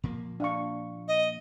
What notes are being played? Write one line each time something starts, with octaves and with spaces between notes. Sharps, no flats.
A#2 F3 A#3
D4 F5 C#6
D#5